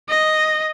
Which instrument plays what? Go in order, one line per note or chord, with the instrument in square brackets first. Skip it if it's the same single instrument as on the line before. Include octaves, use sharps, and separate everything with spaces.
[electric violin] D#5